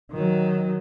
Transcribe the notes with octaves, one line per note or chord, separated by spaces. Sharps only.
D#3 F#3